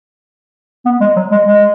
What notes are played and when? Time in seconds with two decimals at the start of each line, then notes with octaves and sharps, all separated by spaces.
0.85 B3
1.01 G#3
1.16 F#3
1.32 G#3
1.47 G#3